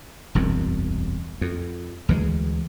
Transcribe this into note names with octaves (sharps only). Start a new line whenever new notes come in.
E1 C2 F#2
F2
D2 E3 G3 G#3